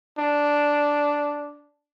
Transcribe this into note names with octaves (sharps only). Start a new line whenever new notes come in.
D4